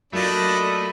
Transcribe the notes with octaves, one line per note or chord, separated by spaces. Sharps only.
F#3 A3 A#3 D4 F4 D#5 B5